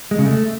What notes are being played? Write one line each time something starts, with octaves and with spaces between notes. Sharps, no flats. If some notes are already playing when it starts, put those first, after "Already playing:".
G#3
C#3
A3